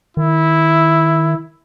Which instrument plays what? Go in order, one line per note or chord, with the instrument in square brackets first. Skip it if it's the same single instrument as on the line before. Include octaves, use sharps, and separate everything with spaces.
[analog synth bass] D#3 [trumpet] E4